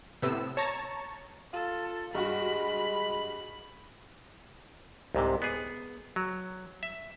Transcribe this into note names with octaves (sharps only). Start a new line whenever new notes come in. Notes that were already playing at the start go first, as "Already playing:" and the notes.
A2 C3 B3 E6
C#5 A5 A#5 C#6
F4 A4
G2 G#3 F#4 B5
C2 G#2 C3
B3 G#4
F#3
E5